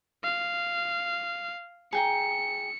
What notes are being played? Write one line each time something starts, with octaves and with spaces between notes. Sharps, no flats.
F5
G#4 G5 A#5 C#7